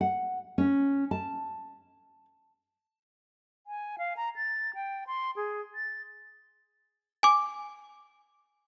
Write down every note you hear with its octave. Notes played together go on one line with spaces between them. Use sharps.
F#5
C#4
A5
G#5
F5
A#5
A6
G5
C6
G#4
A6
G#5 D6